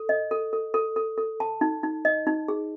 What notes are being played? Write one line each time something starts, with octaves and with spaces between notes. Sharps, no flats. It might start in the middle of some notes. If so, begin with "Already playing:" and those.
Already playing: A4
D#5
A4
A4
A4
A4
A4
A5
D#4
D#4
D#5
D#4
G#4